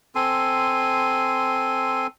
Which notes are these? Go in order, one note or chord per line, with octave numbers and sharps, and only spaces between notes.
C4 A4 G#5 C6